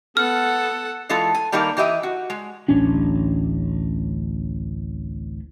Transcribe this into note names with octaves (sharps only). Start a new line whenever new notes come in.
B3 A4 F#5 F6
E3 G#3 F4 A4
G#5
D#3 G3 A#3 D#4 A4 A#4
E3 G4 D#5 E5 G#5
F#4
G#3
D1 A1 C#4 D4